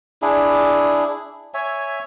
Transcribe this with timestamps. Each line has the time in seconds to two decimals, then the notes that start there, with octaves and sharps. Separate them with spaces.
0.22 D4 E4 G#4
1.54 C#5 E5 G#5